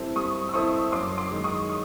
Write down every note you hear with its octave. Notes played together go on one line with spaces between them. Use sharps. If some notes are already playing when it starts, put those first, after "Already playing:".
Already playing: G3 C4 E4 A4
G3 C#6 D#6
E6
C4 E4 A4 C5 C#6 D#6
F#2 C6 D6
C6 D6
D#3 G#3
C#6 D#6
C#6